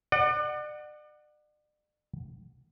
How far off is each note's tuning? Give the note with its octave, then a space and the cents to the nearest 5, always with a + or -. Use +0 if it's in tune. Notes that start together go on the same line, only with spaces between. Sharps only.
D5 +40 F#5 +0